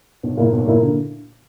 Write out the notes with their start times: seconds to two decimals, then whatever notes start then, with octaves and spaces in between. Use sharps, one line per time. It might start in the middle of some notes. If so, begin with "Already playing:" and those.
0.23 B1
0.37 A#2 A#3 E4
0.53 B1
0.67 A#2 A#3 E4
0.82 D3